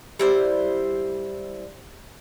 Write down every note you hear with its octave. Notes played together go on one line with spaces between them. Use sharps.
G3 E4 C5